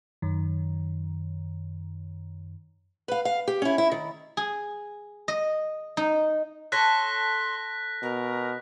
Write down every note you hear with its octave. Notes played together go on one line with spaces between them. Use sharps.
F#2 D#3
B4 F5
F5
G4
C#4 E4
E4
D#3
G#4
D#5
D#4
A4 C#5 C6 F#6 A#6 B6
B2 A#4